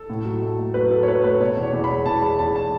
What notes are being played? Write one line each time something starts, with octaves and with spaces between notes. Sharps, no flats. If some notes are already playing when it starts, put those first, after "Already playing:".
Already playing: A4
A2
F#3
A3
A3
F#3 B4
F#3 A4
C#5
A3 B4
A3 B4
B2 C#5
E2
C#5
E2
B5
G#3
E2 A5
G#3 B5
E2 A5
A5